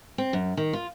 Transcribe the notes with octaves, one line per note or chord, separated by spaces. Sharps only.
C4
F#2
D#3
F4